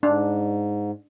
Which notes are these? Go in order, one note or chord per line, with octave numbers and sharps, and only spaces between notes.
G#2 D4